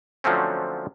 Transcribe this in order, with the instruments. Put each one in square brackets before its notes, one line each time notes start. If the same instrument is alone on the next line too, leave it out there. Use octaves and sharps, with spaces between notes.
[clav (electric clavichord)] D3 F3 F#3 A3 C4 C#4